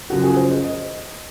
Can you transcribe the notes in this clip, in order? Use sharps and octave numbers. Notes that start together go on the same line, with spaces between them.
F#2 C#3 F3 F#4
G#4
C5
D#5
D#5